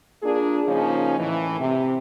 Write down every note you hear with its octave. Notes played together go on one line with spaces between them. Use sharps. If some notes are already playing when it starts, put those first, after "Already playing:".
A#3 D4 F4 G#4
C#3 F3 A#3 C#4 D#4
A2 E3
C3